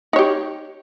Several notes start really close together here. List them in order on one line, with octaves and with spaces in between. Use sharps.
D#4 C#5 G4